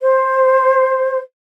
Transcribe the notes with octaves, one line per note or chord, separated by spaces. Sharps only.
C5